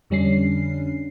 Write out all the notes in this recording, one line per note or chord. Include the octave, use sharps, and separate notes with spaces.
F2 D3 G3 C#4 D4 C7